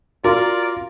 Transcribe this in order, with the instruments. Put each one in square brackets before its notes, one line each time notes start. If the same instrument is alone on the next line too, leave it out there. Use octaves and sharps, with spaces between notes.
[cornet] F4 [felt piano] F#4 [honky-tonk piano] A#4 [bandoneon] D5